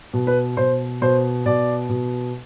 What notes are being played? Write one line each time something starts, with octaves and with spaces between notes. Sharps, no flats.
B2
B4
B2 C5
B2 C5
B2 D5
B2